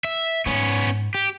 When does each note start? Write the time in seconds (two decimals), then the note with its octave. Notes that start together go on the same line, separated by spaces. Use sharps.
0.04 E5
0.46 G#2 B3 C#4
1.15 G4